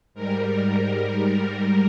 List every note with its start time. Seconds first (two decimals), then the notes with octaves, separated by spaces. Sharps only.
0.14 G#2 G3 A#4